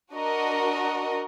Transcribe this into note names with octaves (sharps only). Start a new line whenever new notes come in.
D4 F#4 A#4 D#5